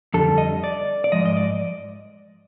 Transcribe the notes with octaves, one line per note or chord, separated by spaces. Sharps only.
F2 D3 G3 A4
D#5
D5
D5
G#2 F3 G#3 D#5
D#5
D5